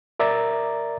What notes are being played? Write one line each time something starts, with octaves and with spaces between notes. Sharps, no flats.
A#4 D5 E5 A#5 D6 A6